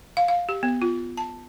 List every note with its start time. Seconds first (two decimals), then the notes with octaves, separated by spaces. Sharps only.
0.17 F5
0.28 F5
0.49 G4
0.63 B3
0.82 F4
1.17 A5